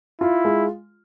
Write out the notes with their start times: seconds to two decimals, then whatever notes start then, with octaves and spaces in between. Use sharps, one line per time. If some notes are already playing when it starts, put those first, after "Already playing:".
0.21 E4 F4
0.45 G#3